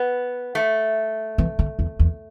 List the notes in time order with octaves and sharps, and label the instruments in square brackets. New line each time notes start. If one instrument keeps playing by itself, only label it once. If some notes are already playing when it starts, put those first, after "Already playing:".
Already playing: [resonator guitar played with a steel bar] B3
A3
[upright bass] E3
D3
E2
E2